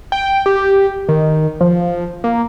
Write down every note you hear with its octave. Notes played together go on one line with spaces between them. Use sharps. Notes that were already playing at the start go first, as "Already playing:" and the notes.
G5
G4
D#3
F3
A#3